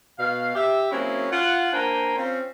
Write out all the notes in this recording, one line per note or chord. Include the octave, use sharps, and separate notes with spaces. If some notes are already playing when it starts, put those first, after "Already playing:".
B2 F5
G4 E5
F#3 A#3 C4 C#4 E4 G#4
F4 F#5
A#3 D4 C5 G5 G#5 A#5
C4 C#4 F4